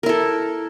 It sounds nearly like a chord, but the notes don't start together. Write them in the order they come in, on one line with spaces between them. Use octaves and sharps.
A#4 E4 A4